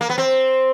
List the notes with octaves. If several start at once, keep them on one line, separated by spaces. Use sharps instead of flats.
A#3
B3
C4